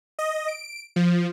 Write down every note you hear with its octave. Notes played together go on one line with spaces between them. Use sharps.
D#5
D7
F3